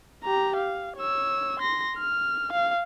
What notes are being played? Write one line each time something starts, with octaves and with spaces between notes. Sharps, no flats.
G4 A#5
F5
C#5 E6
C6 A#6
F6
F5